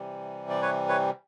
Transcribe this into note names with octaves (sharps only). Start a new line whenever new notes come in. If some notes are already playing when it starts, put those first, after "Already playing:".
Already playing: C3 E3 G3
D5
B4 C#5
B4 C#5